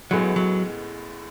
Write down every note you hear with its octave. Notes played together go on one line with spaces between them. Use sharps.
A1 A2 F#3 G#3 B3
F#3